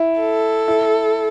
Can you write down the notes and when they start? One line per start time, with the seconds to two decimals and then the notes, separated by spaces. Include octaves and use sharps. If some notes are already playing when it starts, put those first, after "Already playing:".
Already playing: E4
0.19 A4
0.68 E4